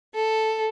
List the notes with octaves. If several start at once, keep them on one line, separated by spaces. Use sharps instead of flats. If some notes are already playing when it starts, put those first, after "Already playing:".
A4